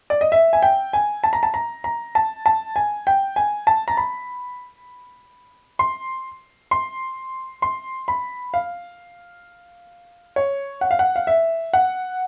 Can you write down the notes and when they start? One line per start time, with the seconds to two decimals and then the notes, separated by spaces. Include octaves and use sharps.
0.10 D5
0.21 D#5
0.32 E5
0.53 G#5
0.62 G5
0.93 G#5
1.24 A5
1.33 A#5
1.43 A5
1.54 A#5
1.84 A#5
2.15 A5
2.46 A5
2.76 G#5
3.07 G5
3.36 G#5
3.67 A5
3.88 A#5
3.97 B5
5.79 C6
6.71 C6
7.62 C6
8.08 B5
8.54 F5
10.36 C#5
10.81 F#5
10.91 F5
10.99 F#5
11.16 F5
11.27 E5
11.73 F#5